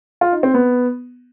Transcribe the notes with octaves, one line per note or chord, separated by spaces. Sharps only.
F4
D#4
C4
B3